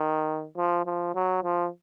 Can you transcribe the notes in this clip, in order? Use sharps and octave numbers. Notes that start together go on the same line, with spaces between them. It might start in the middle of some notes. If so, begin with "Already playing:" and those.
Already playing: D#3
F3
F3
F#3
F3